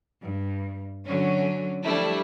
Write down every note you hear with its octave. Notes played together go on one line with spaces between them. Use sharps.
G2
D3 F#3 C#4
F3 G3 A3 D4 E4